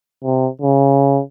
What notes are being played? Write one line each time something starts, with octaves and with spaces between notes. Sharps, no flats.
C3
C#3